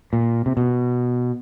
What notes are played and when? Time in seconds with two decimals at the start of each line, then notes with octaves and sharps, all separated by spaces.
0.13 A#2
0.46 C3
0.57 B2